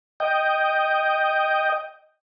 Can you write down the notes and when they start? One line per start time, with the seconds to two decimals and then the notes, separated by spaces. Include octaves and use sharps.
0.20 D#5 G5